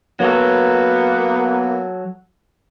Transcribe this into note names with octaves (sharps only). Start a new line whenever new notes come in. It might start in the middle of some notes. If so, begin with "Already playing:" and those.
F#3 A#3 B3 F#4 A4